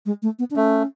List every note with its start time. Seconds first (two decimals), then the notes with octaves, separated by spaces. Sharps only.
0.06 G#3
0.22 A3
0.39 B3
0.50 D4
0.55 A3 C#4